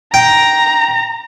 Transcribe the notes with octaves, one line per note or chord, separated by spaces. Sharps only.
G5 A#5